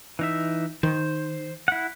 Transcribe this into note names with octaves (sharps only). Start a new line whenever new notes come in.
E3 D#4 E5
D#3 C5
E4 F#5